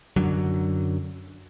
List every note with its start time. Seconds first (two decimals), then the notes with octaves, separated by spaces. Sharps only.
0.16 F#2 D3 F#3